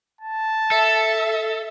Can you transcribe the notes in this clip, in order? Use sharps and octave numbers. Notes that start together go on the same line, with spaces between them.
A5
A4 E5